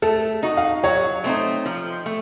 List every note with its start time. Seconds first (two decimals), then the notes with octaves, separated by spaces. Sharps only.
0.02 A3 A4
0.43 D#4 F#4
0.57 F5
0.83 F#3 C#5
1.24 A3 C4 D#4
1.66 F3
2.06 A3